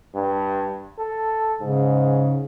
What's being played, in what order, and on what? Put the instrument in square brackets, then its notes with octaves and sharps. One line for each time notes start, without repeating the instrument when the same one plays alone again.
[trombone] G2
A4
[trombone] G#2 [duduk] C#3